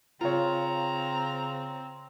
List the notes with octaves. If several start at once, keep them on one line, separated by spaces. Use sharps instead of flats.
C#3 C4 F4 C#5 A#5